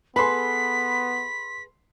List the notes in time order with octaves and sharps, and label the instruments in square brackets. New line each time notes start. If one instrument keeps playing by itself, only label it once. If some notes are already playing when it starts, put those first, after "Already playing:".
[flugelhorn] B3 [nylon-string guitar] G#4 A4 B4 [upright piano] B5 C6 [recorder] B6